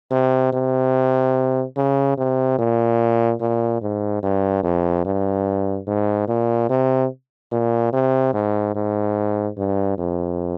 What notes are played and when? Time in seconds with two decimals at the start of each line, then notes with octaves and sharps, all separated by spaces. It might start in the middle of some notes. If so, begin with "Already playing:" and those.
0.11 C3
0.53 C3
1.77 C#3
2.17 C3
2.59 A#2
3.41 A#2
3.82 G#2
4.23 G2
4.63 F2
5.05 G2
5.87 G#2
6.28 A#2
6.69 C3
7.52 A#2
7.93 C3
8.33 G#2
8.75 G#2
9.57 G2
9.98 F2